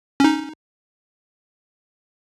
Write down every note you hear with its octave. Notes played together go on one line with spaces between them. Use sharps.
C#4 D#4